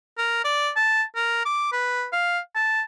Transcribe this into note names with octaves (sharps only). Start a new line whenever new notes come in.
A#4
D5
A5
A#4
D6
B4
F5
A5